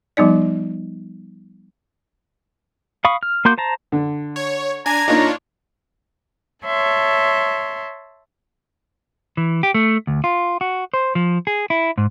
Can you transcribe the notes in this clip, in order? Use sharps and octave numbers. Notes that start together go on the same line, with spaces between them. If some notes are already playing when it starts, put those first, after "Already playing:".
F3 G3 B3 D#4 D5
F5 B5 C#6 D#6
F6
A#3 F#4 C6 D6 G6
C5 A5 A#5
D3
C#5
D4 G#5 A#5 G#6
A#3 D4 D#4 F4 C#5
C#5 E5 A5 C6
E3
G4
A3
D2
F4
F#4
C5
F3
G#4
E4
G#2